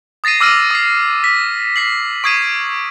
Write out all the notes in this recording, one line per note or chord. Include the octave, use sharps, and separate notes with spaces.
D#6 A6 A#6 C7 D#7
D6 E6 F6 A#6 D#7
D#6 C7
B6
B6 C7 F#7
C#6 D#6 G#6 C7 D#7